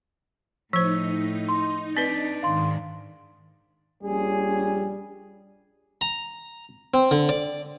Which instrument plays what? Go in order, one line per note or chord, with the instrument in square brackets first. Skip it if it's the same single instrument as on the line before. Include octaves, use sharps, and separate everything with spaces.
[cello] A2 [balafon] F3 C5 [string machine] D#4 [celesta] E6
[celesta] C6
[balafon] C4 B4 [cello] D4 D5 [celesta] B6
[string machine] G#2 D#3 [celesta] F5 C6
[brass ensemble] A#1 C#4 G#4 [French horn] G3
[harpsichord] A#5
C4
D3
D5